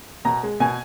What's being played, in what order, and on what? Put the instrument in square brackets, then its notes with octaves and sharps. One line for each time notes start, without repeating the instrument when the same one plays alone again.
[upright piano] B2 A#5
G#3
B2 G#5